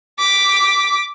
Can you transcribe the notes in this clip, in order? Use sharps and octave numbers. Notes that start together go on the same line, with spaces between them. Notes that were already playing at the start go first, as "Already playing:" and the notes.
D6 B6